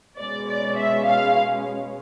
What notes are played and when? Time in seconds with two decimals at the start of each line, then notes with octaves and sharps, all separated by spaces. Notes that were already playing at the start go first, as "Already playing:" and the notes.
0.17 B2 G#3 C#4 D5
0.48 D5
0.77 E5
1.06 F5